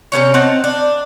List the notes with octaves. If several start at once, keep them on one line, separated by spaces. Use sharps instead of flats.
C3 B3 C#4 C#5
C4 D#4 F#5 A5
D4